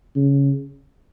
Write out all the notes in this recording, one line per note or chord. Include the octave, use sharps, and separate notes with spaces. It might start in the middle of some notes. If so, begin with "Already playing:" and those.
C#3